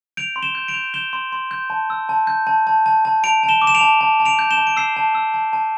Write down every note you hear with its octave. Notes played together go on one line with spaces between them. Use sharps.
G6 D7 F7
C6
E7 G7
G6
D7 F7
G6
G6 E7 G7
C6
C6
G6
A5
E6
A5
G6
A5
A5
A5
A5
A5 D7 F7
A5
E7 G7
D6
E7
D7 F7
A5
A5
A5
D7 F7
G6
E7 G7
A5
D7
E6 C7 E7
A5
E6
A5
A5